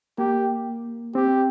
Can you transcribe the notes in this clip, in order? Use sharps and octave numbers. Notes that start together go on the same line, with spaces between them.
A#3 G4
C4 G4